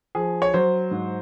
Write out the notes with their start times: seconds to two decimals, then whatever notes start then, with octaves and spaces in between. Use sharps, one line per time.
0.15 F3 G#4
0.42 C#5
0.54 F#3 C5
0.91 G#2